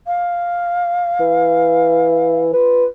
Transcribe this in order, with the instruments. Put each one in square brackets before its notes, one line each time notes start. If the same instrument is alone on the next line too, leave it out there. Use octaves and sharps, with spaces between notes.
[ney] F5
[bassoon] E3
[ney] F4 [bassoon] B4